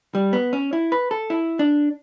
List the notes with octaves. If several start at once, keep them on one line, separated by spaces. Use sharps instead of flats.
G3
B3
C#4
E4
B4
A4
E4
D4